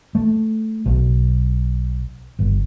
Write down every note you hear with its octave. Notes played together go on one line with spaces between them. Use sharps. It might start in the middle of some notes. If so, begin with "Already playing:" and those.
A3
B1
G1